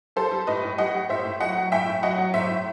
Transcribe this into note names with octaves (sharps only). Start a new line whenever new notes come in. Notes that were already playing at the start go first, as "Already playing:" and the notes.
G3 A4 C5
G3
A2 B4 D#5
A2
G3 D#5 F#5
G3
A2 C5 E5
A2
F#3 D#5 F#5
F#3
A2 E5 G5
A2
F#3 D#5 F#5
F#3
A2 C5 E5
A2